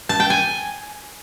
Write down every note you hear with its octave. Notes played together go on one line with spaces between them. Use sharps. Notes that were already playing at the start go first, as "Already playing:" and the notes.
A5
G5
G#5